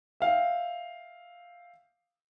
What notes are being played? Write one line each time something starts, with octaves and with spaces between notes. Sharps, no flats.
E5 F5 G5